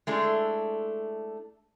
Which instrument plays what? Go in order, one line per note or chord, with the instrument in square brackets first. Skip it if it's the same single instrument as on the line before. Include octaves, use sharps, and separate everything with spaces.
[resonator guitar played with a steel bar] G#3 A3 D4 E4